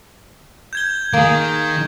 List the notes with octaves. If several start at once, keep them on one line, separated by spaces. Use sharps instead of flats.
G6 G#6 G7
D#3 A#3 G#4